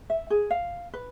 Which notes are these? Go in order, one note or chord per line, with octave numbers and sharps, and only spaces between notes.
E5
G#4
F5
B4